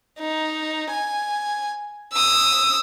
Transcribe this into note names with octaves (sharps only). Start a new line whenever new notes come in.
D#4
G#5
D#6 E6